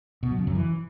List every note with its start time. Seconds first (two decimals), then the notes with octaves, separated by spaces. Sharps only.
0.23 B2
0.31 F#3
0.39 C#3
0.47 F#2
0.55 E3